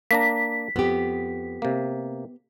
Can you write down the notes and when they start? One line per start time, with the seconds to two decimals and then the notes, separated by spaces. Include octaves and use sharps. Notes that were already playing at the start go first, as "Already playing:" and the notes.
0.11 A#3 D4 A#5 B6
0.76 F2 B3 G4
1.62 C3 A#3